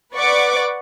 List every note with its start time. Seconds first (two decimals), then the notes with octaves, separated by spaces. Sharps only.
0.14 B4 D5 F#5 C#6 D6